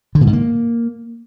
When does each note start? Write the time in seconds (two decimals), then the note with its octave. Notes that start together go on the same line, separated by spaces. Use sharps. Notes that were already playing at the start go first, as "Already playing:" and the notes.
0.15 D3
0.21 A#2
0.27 G#2
0.33 A#3